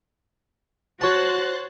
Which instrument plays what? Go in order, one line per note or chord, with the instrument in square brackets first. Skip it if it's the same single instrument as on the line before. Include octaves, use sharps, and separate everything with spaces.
[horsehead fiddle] F#4 [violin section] C5 F#6 A6 [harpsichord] C#5 A5